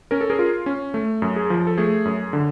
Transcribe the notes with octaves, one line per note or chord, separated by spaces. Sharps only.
C#4 A#4
A4
G#4 A#4
F4
C#4
A3
F#2
G#4
F3
A4
A3 G#4
F#2
D3